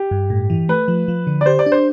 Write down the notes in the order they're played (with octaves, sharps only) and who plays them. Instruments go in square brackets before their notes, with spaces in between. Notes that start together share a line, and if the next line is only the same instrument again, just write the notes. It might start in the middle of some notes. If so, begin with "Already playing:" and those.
Already playing: [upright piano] G4
[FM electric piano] G2
A2
E3
[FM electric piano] A3 [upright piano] B4
[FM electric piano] F3
F3
D3
[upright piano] D5
[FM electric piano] G4 [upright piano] C5
[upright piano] D5
[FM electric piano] D4
[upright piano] C5